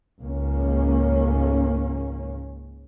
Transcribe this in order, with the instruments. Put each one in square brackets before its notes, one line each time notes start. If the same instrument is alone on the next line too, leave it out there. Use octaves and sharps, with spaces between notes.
[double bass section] C#2 G#2 A#3 C#4